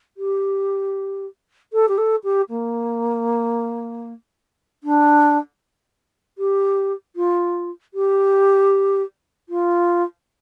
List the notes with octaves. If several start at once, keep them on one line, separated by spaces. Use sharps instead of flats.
G4
A4
G4
A4
G4
A#3
D4
G4
F4
G4
F4